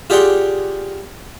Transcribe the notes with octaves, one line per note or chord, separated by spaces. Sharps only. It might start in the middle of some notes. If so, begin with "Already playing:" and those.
F4 G4 G#4 D5 F#5 C6